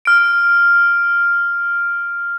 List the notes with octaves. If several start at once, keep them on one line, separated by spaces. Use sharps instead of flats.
F6 D7